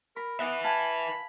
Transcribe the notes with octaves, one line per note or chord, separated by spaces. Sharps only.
A#4 B5
B3 B4 E5 F#5
F5 G#5 A5 B5